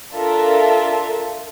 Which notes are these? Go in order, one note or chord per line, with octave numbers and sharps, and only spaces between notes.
D4 F4 A4 A#4 E5